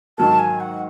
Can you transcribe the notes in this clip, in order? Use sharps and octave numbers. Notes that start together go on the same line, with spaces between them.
G#2 D#3 F#3 A#3 A5
G#5
F#5